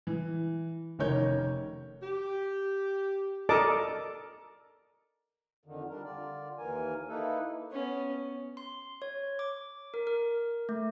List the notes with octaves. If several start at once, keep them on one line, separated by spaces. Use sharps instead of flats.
E3
F1 D#3 C#4 A#4 C#5 G6
G4
A4 A#4 D5 D#5 A5 D6
F2 D3 D#3
G3 D4 A#4
D3 F4 D5
D#2 E3 A#4 G#5
A#3 D#4 E4 A4 B4
B3 C#4
C6
C#5
D6
A#4
A#4
A3